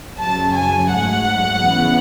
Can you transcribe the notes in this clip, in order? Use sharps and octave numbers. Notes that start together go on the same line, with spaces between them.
F#2 C#3 F#3 A5
G#5
G#2 F#3 A3 F#5
C#3 E3 B3